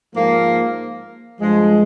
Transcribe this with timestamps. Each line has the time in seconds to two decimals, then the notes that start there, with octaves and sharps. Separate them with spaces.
0.14 G#2 F3 A#3
1.39 G2 F3 G#3